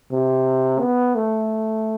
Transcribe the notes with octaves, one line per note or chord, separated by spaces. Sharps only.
C3
B3
A3